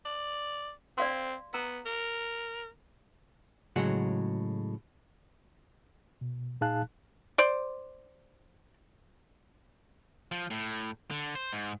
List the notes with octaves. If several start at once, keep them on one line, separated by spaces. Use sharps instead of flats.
D5
C4 D5 F5 C6
B3 A#5
A#4
A2 C#3 F#3 G#3 F#4 F#5
B2
A#2 D#4 G#4 F5 A5 F#6
C5 D5
F3
A2
D3
C5
G#2